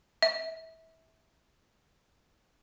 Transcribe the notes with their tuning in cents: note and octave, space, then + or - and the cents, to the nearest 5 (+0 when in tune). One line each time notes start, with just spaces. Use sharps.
E5 -25